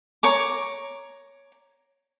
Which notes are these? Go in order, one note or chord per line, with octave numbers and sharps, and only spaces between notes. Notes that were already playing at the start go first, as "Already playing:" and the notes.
C#5 A#5 D6